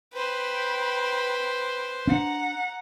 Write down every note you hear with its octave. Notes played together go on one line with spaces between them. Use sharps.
B4 C5 G5 B5
C#4 D4 F#5 A#5